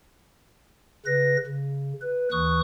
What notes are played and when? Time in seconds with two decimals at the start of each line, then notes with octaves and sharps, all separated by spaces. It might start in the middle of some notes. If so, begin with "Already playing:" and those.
1.06 C#3 B4 A#6
1.47 C#3
2.02 B4
2.32 D#2 E3 C#6 D#6 F#6